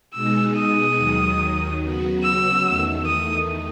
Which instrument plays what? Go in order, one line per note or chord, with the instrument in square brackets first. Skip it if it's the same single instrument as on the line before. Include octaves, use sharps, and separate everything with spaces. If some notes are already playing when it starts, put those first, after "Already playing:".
[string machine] B2 G#3 B3 D#4 G#4 [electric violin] E6
[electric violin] D#6
[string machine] D#2 D#3 F#3
C#3 F#3 B3 F#4
[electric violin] E6
[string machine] E2 D#3 A3
[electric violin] D#6